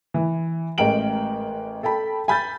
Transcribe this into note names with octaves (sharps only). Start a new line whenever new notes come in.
E3
A1 G#3 A#4 G5 D7 F#7
A4 G5 A5 B5
G#5 B5 G6 A6